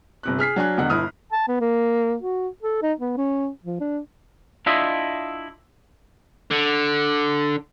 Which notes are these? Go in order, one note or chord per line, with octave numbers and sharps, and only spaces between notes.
G1 C3 F#6
G#4 F6 B6 C7
F#3 D4 G#5 F#6
E1 B2 D3 F#5 F#6
G1 E4 D#6 F6
A5
B3
A#3
F#4
A4
D#4
B3
C#4
F3
D4
D4 E4 F4 D#5 E5
D3